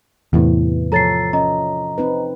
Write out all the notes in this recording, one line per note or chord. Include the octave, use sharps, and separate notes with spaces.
E2 A2 C3 E3
F3 A4 C#5 A#5 A6 C7
C#4 D#5 A#5
C4 D#4 B4